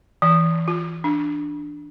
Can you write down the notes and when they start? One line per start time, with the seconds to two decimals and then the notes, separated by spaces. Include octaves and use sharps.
0.22 E3
0.68 F4
1.04 D4